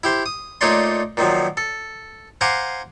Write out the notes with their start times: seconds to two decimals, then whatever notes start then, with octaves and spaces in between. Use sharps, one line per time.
0.03 E4 G4 C5
0.26 D#6
0.61 A#2 A3 D#4 C#5 D5 C6
1.17 A#2 D#3 F3 F#3
1.57 A4
2.41 C5 F5 F#5 G#5 A#5 D6